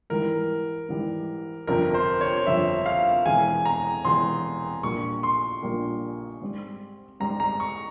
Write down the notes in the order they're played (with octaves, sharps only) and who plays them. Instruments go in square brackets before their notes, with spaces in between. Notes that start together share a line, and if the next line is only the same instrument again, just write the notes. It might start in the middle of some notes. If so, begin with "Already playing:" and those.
[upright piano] G#2 E3 G3 [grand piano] A#4
[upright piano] G#2 E3 G3
[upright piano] G1 F2 C3 [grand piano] A#4
[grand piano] C5
C#5
[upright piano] G1 F2 C3 [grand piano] E5
[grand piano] F5
[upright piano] E1 E2 C3 [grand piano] G#5
[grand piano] A#5
[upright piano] E1 E2 C3 [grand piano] C6
[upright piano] A#1 A#2 G3 A#3 [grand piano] C#6
[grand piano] C6
[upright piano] A#1 A#2 G3 A#3
G#2 G3 C4
[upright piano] G#2 G3 C4 [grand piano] A#5
[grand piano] A#5
C#6